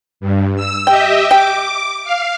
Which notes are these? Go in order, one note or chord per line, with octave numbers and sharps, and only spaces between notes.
G2
E6
G4 D#5 E5 G5
G5 D6
F5